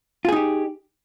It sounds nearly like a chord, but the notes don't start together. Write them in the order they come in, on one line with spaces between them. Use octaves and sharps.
F4 G#4 D#4 G4